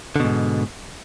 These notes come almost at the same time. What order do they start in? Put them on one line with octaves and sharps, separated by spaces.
D3 B2 G#2